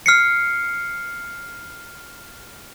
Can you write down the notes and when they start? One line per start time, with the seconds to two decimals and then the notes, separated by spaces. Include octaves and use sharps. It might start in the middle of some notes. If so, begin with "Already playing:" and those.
0.06 F6 C7 C#7